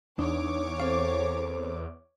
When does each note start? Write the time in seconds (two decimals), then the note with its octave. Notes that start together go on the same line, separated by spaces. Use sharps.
0.19 E2 D4 D#4 C#5 D6
0.80 C4 A4 C5 F5